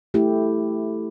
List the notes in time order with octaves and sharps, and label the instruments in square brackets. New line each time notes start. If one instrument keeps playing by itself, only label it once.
[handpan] A3 E4 G4